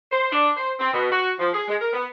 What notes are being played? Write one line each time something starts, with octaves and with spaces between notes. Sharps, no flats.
C5
D4
C5
C4
B2
F#4
F3
G#4
G#3
A#4
B3